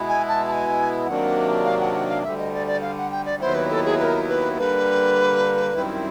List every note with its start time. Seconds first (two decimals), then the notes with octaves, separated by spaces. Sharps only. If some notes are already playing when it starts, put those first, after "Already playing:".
Already playing: B2 G#3 B3 E4
0.09 G#5
0.28 A5
0.48 A5
0.53 G#5
1.06 C3 D#3 F#3 A#3 D4 F#5
1.65 F5
1.80 F#5
1.94 F#5
2.09 F5
2.23 D2 D3 G3 E5
2.39 D#5
2.53 D5
2.67 D5
2.82 F5
2.97 F#5
3.11 G5
3.25 D5
3.41 D#2 D#3 F#3 B3 E4 C5
3.55 B4
3.70 A4
3.85 G#4
3.99 B4
4.04 A#4
4.29 B4
4.57 D3 G3 A#3 B4
5.74 F#2 D#3 G3 C4 E4